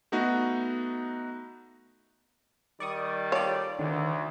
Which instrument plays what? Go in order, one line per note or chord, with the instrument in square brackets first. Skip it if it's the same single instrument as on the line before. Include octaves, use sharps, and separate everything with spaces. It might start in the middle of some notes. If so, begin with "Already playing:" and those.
[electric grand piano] A3 B3 D#4 F#4
[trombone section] D#3 G3 [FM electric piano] D5 C#6 D#6
[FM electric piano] F4 A4 D5 [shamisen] C#5
[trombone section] D2 [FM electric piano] D3 [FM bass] D#3